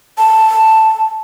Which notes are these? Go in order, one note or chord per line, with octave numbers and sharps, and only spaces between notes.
A5